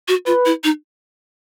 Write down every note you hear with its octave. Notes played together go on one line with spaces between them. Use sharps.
F#4
F4 B4
E4
D#4